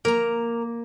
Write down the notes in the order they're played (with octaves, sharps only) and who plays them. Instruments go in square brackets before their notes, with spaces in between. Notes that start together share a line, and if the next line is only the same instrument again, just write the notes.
[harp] A#3 [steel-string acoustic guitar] A#4 A#5